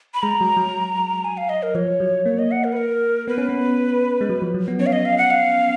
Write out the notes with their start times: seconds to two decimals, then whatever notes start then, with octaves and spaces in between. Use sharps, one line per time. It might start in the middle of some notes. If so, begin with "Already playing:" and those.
0.14 B5
0.23 G#3 A#5
0.41 F#3
0.57 F#3
1.25 G#5
1.37 F5
1.49 D#5
1.63 A#4
1.75 F3 C#5
2.00 F#3
2.25 A#3 C#5
2.39 D#5
2.51 F#5
2.64 A#4
2.72 B4
2.77 A#4
3.28 B3 B4
3.38 C#4
3.49 B3
4.21 G#3
4.29 F#3
4.42 F3
4.54 F#3
4.68 B3
4.79 C#4 C#5
4.86 F5
4.92 D#5
5.05 F5
5.18 F#5
5.31 F5